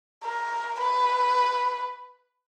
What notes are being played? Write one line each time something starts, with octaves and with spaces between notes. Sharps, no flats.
A#4
B4